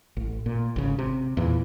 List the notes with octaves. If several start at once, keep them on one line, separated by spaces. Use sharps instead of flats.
A1
A#2
G#1 C#3
C3
E2 A#2 E3